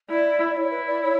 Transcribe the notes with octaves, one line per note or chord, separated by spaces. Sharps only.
E4 D5
D5
E4 C#5
B4
D5
C#5